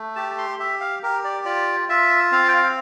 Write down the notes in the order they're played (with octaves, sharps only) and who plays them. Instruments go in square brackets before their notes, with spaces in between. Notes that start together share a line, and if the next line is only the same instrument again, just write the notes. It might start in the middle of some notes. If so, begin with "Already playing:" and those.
Already playing: [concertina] A3
G4 A5
C6
G4 E5
F5
G4 A#4
D5
F4 D5
F4 E5
C4 F5
G5
F5